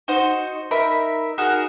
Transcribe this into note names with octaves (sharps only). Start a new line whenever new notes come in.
D#4 F#4 C5
D#4 A#4 E5 B5
D#4 F#4 G#4 A#4